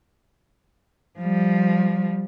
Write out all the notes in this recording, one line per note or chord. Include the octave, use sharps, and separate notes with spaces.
F3 G3